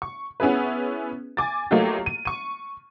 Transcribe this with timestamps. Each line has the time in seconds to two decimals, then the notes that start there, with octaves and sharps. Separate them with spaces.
0.02 C#6
0.40 B3 C#4 E4 G#4 B4
1.37 G#5 D6 A6
1.71 F#3 A3 A#3 D#4 F4 G4
2.06 D#7
2.25 C#6 D#7